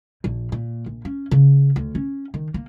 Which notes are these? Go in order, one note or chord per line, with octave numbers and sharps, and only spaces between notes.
A#1
A#2
A#1
C#4
C#3
D2
C#4
D#3
A#3